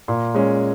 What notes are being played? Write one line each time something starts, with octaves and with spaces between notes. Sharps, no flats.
A#2
G#3 C#4